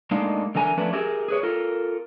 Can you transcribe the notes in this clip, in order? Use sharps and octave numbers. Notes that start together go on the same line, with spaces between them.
A2 G#3 A#3 D4 D#4 F5
D3 E3 A#4 G#5 A#5
F3 A3 C#4 D4 B4
G4 G#4 A#4 E5
G#4 B4 C#5
F4 A4 A#4